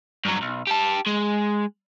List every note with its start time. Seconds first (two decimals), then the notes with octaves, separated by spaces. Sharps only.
0.25 G2 F#3
0.42 B1
0.67 G4 A5
1.06 G#3